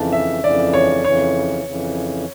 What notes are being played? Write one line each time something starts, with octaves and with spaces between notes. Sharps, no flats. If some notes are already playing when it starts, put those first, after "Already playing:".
Already playing: F2 C#3 E3 A5
E5
F2 C#3 E3 D5
C#5
F2 C#3 E3 C#5
F2 C#3 E3